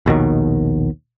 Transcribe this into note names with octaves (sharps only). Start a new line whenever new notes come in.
A#1 D#2 B2 D#3